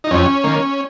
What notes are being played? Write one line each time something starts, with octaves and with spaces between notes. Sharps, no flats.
D#4
F2 C#4
D#3 A#3